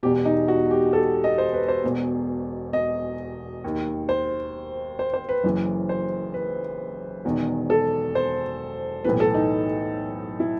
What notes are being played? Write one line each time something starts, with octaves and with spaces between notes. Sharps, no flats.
E1 E2 B2 G4
D#4
F#4
G4
A4
D#5
C5
B4
C5
E1 E2 B2
D#5
D#2 D#3
C5
C5
C5
B4
F#1 F#2 E3
C5
B4
E1 E2 D#3
A4
C5
B1 A2 E3 B4
A4
D#4
E4